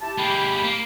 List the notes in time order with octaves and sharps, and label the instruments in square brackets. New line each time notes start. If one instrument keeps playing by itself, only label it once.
[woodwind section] E4 G4 A5
[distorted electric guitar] G#3 A#3 [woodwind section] G4 G5 B5
[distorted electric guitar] A#3